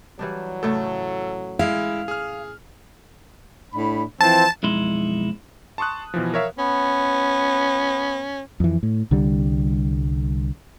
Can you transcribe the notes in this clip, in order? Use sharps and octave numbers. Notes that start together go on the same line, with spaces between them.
E3 F#3 G3 D4
A2 C#3 A3 A4
G#3 E4 F5
G#4 F6
A2 D4 B5
E3 F3 C4 A5
B1 F2 G#3 D#4 E4 C6
A5 C6 C#6 D#6 F#6
B2 E3 F3
A#4 C#5 E5 F5
B3 C#4
F2 E3
A2
C2 D3 G3